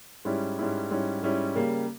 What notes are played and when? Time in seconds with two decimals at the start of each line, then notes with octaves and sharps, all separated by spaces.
0.25 G#2 G3 C#4 E4
0.58 G#2 G3 C#4 E4
0.91 G#2 G3 C#4 E4
1.22 G#2 G3 C#4 E4
1.55 C#3 G3 A#3